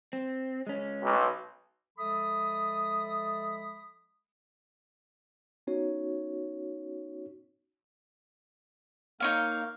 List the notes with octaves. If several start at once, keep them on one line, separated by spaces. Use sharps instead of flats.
C4
G#3 C#4
B1
F3 G#3 A4 E5 B5 D#6
B3 C#4 D#4 F#4 C#5
A#3 D#4 C#5 F5 F6